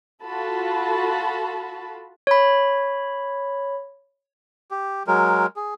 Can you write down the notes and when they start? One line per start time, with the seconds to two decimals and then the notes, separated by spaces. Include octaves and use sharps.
0.23 F4 F#4 A4 A5 B5
2.27 C#5 B5
4.71 G4
5.07 F#3 G#3 A#4
5.56 G#4